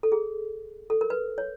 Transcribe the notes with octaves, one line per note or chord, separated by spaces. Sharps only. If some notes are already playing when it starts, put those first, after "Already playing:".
A4
G#4
A4
A#4
B4
C#5